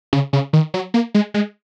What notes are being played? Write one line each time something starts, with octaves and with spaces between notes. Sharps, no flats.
C#3
C#3
D#3
F#3
A#3
G#3
G#3